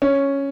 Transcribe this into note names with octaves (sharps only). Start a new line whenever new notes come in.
C#4